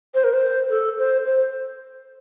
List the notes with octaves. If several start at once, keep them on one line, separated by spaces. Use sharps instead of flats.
C5
A#4
C5
A4
C5
C5